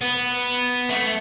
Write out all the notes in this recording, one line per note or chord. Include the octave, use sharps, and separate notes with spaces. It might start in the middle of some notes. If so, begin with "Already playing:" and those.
B3
A3